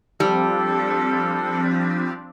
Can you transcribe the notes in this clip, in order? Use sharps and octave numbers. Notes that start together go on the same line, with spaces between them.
F3 G3 C4 D4 A4